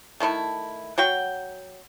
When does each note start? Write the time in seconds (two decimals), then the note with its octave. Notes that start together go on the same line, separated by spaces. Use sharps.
0.20 D#3 A3 E4 A4
0.98 F#3 F#4 G5